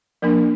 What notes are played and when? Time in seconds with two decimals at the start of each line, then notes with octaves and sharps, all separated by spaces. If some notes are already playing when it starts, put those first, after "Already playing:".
0.22 F3 A#3 D4 A#4